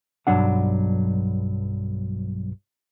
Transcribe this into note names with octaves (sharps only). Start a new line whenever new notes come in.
B1 G2 F#3 D4 F#5